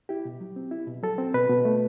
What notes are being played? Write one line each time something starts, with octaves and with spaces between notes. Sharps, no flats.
E4 G4
B2
F#3
C4
E4
B2
F#3 A4
C4
B2 B4
B2
A3